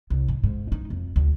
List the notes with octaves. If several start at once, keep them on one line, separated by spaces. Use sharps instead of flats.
C2
G#2
G#2
D#4
F2
D2